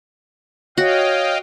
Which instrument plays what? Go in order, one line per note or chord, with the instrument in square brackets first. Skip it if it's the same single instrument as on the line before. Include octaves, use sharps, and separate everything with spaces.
[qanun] F#4 [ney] C#5 [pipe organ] D#5 F5 G5